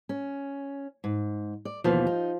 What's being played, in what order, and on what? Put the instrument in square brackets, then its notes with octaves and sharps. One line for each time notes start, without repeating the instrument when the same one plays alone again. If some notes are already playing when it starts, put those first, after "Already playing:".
[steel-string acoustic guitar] C#4
G#2
D5
[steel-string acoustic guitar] D#2 B2 E3 [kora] F3 F4
[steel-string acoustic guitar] D#4